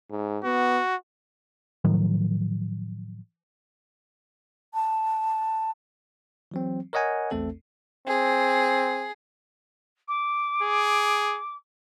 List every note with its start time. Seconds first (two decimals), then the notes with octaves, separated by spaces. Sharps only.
0.10 G#2
0.44 B3 F#4
1.85 A2 D#3 F3 F#3
4.74 A5
6.51 E3 F#3 C4
6.93 A#4 C#5 D#5 F#5 G#5 A#5
7.31 A#1 E2 A3 C4 A4
8.07 C4 G#4
10.08 D6
10.63 G#4